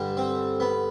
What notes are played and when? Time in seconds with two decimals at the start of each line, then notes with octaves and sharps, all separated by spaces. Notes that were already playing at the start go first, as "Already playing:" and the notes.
Already playing: G2 D3 G3
0.17 C4
0.60 B3